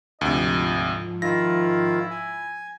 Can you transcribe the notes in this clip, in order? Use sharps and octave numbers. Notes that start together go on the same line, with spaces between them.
D2 G#2 C3 F3 D#5
D#3 E4 F4 A#6
G#5